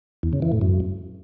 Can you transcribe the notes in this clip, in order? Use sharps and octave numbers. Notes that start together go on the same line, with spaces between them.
E2
C#3
E3
A2
F#2